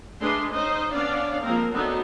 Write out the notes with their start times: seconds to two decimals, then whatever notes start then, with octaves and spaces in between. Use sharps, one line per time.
0.21 G#3 A3 D4 B4 C6
0.51 C#4 D#4 C5 D#5
0.92 B3 C#4 D4 D5 F5
1.42 F3 G#3 A#3 C4 A#4
1.72 F#3 A3 B3 C4 D4 D#4